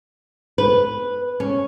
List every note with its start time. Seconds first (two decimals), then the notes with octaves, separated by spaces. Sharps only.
0.58 B4
1.40 C#4